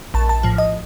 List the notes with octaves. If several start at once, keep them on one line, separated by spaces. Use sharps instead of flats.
A#1 A5
A5
A2 F3
D#5